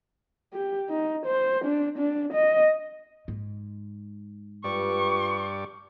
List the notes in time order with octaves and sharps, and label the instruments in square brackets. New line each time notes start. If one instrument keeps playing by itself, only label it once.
[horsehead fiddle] G4
D#4
C5
D4
D4
D#5
[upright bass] G#2
[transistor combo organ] G2 D5 [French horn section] F4 G4 B4 [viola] C#6